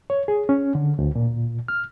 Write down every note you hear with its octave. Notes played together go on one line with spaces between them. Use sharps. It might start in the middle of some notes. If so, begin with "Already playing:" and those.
C#5
G#4
C#4
D3
D2
A#2
F6